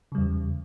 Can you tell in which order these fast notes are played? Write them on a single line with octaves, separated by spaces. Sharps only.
C#3 G3 E2